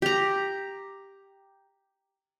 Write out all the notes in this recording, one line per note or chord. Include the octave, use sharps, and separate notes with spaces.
G4 A#5